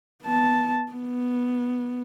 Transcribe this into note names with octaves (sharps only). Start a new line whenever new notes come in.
B3 A5
B3